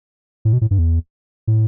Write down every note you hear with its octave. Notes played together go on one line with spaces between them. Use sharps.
A2
B2
A2
G2
E2
A2